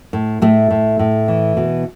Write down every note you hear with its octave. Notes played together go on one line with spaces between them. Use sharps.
A2
A2 A3
A2
A2
E3
B2